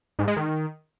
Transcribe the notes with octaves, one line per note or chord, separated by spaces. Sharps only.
G#2
G#3
D#3